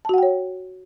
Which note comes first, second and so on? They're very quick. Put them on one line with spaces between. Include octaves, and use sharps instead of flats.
A5 F#4 F#5 G5 C#5